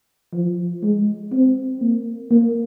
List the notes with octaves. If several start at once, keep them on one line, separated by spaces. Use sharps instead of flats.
F3
G#3
C4
A#3
A#3